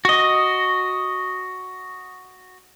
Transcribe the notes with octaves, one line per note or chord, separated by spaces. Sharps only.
F#4 D#5